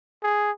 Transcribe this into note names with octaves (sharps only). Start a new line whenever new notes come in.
G#4